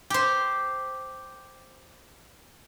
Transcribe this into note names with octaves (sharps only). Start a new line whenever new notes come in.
G4 C5